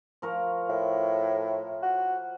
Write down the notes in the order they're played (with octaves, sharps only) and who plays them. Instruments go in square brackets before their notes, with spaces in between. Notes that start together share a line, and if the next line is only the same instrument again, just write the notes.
[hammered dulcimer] F3 A#4 C#6
[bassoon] A2
F#4